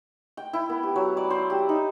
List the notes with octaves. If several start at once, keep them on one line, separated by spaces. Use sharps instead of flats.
G5
E4
B3
G4
F#3
D5
C5
G4
D#4